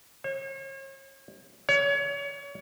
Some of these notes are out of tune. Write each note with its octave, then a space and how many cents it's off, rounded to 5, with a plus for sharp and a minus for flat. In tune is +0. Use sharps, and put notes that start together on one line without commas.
C#5 -40
C#5 +30